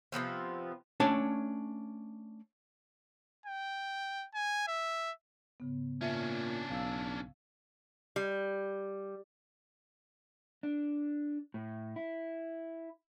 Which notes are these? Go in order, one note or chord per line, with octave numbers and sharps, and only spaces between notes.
C3 F3 B3 C4
A3 C#4 D4 C#5 A5
G5
G#5
E5
G#2 C#3 B3
A#2 C#4 D4 E5
B1 F5 E6
G3
D4
A2
E4